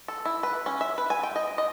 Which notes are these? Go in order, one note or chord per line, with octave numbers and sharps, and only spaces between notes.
A4
E4
B4
C#4
E5
B4
G#5
G5
D#5
D#5